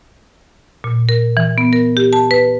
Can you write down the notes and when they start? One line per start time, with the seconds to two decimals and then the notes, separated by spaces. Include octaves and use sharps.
0.84 A#2
1.09 A#4
1.37 E3
1.58 B3
1.73 A#4
1.97 G4
2.13 A5
2.31 B4